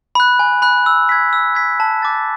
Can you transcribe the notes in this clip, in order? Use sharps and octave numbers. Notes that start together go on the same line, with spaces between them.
B5 F#6
G#5
B5 F#6
E6
G#6 B6
E6
G#6 B6
A5
D6 A6